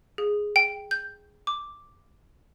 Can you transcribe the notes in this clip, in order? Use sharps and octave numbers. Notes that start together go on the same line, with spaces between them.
G#4
G5
G6
D6